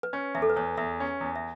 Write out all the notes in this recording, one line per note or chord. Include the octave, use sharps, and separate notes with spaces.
B4
C#4 C#5
E2 E5
A4
B4
E2 C#5
E2 E5
C#4
E2
E5